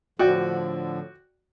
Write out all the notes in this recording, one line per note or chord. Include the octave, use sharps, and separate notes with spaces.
A2 D3 F3 F#4 D5 G5